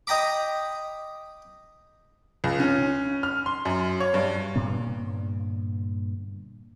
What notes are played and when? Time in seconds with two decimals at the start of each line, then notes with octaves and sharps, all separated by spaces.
0.07 D#5 G5 A#5 B5 D6
2.44 C#2
2.60 C#4
3.23 F6
3.46 C6
3.65 F#2
4.00 C#5
4.14 G2
4.56 G2 A#2 D3 B3